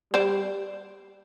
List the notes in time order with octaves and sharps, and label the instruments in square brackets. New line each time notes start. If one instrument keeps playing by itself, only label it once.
[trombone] G3 [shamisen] C5 D5